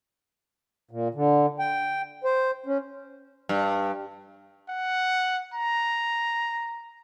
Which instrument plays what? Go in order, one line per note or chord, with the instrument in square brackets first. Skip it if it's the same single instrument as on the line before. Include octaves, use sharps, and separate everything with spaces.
[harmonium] A#2
D3
G5
C5
C#4
[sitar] G2
[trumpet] F#5
A#5